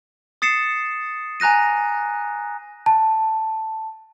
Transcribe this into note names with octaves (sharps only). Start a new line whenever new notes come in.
D#6 A6 C7 C#7 E7
G#5 A#5 F#6 A#6 D#7
A5